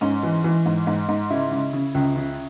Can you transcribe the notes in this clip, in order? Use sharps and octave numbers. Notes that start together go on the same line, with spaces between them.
G#2 C#4
E3
E3
G#2
G#2
G#2
C#3 E4
C#3
C#3
C#2
C#3